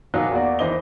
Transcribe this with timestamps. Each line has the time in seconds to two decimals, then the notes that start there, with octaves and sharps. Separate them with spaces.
0.14 A#2 F3 F#3 A#3 D#4 F4
0.31 E2 A#3 F#4 D5
0.59 D#2 E3 C5 D#5 G7